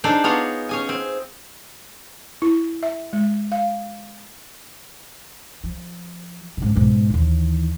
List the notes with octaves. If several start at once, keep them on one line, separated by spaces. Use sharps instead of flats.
D4 D#4 G#4 A4 C5 D5
B3 F4 G#4 C#5 A#5
C#4 G#4 G#5
C4
E4
E5
G#3
F5
F3
G#2 C#3
B1 G#2
D#2 E3